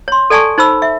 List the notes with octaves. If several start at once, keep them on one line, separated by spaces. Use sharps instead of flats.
C#5 C6
A4 D5 G#5 A5 C#6
D#4 C5 B5 E6
E5